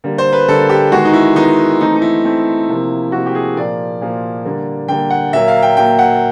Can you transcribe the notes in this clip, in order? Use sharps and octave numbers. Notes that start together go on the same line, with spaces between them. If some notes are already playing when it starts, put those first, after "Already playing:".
D3 G3 A#3
C5
B4
D3 G3 A#3 A4
G4
D#3 G#3 B3 F#4
D#4
E4
D#3 G#3 B3 D#4
E3 A3 C4 D#4
D#4
E4
E3 A3 C4
C3 F3 A#3
C3 F3 A#3 F#4
G4
G#4
A#2 F3 A#3 D5
A#2 F3 A#3
D3 G3 A#3
D3 G3 A#3 G5
F#5
A#2 F#3 A#3 E5
F5
G5
A#2 F#3 A#3 G5
F#5